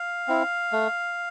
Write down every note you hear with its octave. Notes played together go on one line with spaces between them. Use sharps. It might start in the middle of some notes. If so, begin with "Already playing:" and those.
Already playing: F5
C4 E4
A3